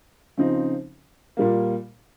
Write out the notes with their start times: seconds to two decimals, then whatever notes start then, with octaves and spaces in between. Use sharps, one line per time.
0.37 C#3 F3 C4 D#4
1.37 A#2 G3 A#3